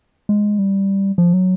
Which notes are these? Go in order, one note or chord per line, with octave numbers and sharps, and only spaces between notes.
G#3
G3
F3
F#3